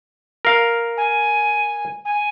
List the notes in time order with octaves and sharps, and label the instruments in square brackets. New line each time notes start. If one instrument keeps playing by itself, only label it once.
[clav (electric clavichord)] A#4 F5
[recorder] G#5
G#5